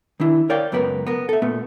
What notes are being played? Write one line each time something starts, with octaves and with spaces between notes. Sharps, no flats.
D#3 D4 E4
A#4 C#5 D5 F5 G5
C#2 F#2 B3 A#4 B4
B3 A#4
A4 E5
A#2 A3 B3